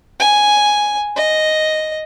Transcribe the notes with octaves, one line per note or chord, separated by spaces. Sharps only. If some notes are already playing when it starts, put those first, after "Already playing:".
G#5
D#5